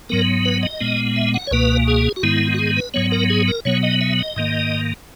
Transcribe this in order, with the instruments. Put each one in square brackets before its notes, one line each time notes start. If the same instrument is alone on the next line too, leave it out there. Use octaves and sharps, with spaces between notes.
[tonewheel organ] G#2 F#3 B3 A#4
B4
D#5
A#2 G#3 B3
E5
F#5
C#5
C#2 B2 A#3 B4
G#4
F#4
G#2 D#3 G#3 B3 E4
F#4
G#4
B4
G#2 F#3 B3 C#5
A#4
G#4
A#4
B2 F#3 B3 C#5
D#5
E5
D#5
G#2 D#3 A#3